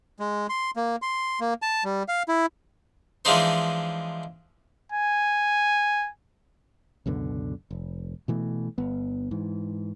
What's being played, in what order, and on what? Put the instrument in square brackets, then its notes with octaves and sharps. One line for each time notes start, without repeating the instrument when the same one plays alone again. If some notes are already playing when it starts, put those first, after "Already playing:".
[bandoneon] G#3
C6
A#3
C6
A#3
A5
G3
F5
E4
[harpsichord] E3 F3 G#3 D4 D#4 C5
[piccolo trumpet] G#5
[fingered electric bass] C#2 F#2 B2 D3
F1
B2 E3 A3
G1 B3
G#2 E3